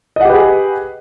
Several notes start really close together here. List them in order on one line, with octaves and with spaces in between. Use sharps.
D#5 F#5 G4 B4 G#4